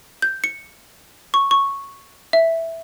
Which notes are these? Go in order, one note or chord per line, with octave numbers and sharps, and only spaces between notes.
G6
C#7
C#6
C#6
E5